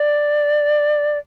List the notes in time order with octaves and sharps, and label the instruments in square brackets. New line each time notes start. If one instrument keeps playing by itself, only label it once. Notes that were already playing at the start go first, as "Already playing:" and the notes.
Already playing: [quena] D5